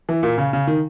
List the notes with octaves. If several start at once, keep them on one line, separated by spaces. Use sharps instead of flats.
E3
A#2
C#3
C#3
D#3